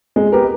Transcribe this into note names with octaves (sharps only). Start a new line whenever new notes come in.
G#3
B3 G4 A#4